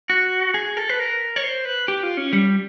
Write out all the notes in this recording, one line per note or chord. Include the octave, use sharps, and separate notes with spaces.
F#4
G#4
A4
B4
A#4
C#5
C5
B4
G4
F4
C#4
G3